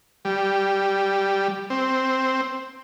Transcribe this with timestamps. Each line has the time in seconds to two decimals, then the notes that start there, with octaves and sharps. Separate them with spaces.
0.25 G3
1.70 C4